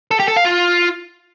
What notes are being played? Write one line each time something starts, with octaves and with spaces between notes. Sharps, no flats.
A4
G4
A4
F5
F4